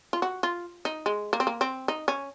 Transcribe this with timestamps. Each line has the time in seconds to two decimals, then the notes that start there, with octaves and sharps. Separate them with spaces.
0.13 F4
0.22 F#4
0.43 F4
0.85 D#4
1.06 G#3
1.33 A#3
1.40 C4
1.47 A#3
1.61 C4
1.88 D#4
2.08 C#4